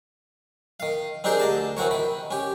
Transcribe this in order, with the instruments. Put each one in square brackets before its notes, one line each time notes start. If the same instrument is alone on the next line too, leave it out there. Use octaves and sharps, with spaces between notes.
[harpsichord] D#3 F5
C4 D4 D#4 G4 G#4 A#4
D2 D#5 A5
E3 C4 F#4 A#4 C#5
D#3 B5
C#4 G4